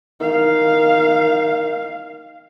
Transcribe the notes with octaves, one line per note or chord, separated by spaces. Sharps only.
D#3 F5